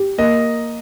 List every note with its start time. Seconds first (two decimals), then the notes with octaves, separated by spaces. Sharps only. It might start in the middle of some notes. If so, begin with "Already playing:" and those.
Already playing: G4
0.18 A#3 D#5